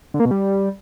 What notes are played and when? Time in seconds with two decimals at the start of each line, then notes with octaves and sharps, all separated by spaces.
0.14 D3
0.20 A#3
0.25 B2
0.31 G3